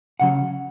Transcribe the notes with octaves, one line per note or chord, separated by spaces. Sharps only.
C#3 F#3 F#5